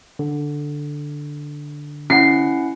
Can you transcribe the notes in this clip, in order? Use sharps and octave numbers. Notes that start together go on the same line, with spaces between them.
D3
C#4 E4 F#5 C7